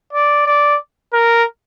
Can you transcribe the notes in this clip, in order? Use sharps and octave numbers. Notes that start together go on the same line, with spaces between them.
D5
D5
A#4